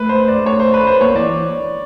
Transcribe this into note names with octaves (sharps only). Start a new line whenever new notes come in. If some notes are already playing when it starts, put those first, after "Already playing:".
Already playing: A3 B4
C5
D5
C#5
C5
B4
C5
A#3 C#5
E3 D5